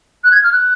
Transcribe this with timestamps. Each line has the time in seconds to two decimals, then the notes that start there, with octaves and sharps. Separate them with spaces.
0.24 F#6
0.32 G#6
0.43 F6
0.52 F#6